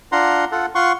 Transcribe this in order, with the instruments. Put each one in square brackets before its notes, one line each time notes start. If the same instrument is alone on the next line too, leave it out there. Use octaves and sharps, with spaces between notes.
[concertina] D4 F4 F#5 A#5 C6
F4 A4 F#5
F4 F#5 C6 C#6